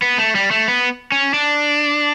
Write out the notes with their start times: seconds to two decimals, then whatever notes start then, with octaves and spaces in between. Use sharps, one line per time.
0.02 B3
0.18 A3
0.35 G3
0.51 A3
0.68 B3
1.12 C#4
1.34 D4